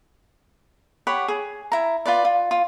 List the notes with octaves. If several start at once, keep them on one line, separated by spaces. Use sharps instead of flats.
G4 C#5 F#5 B5
G#4
E4 A#5
F4 B4 D5
F4
F4